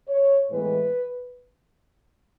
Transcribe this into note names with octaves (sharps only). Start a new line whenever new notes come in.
C#5
A2 E3 G#3 B3 B4